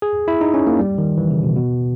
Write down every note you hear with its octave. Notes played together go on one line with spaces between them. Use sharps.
G#4
E4
D#4
C#4
A#3
G3
D#3
E3
C#3
B2
B2